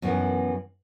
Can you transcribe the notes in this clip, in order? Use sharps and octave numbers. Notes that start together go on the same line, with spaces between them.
F#2 B2 D#3 E3